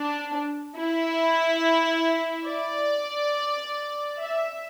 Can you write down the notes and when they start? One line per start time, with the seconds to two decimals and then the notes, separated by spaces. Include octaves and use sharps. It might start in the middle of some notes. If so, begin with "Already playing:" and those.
Already playing: D4
0.78 E4
2.48 D5
4.19 E5